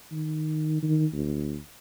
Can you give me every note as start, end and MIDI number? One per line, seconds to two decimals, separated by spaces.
0.12 0.80 51
0.82 1.06 51
1.13 1.57 38